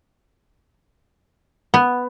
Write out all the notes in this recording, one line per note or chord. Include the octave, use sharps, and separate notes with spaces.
B3